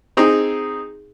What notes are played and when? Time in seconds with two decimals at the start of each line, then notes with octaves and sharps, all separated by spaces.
0.17 C4 D#4 G#4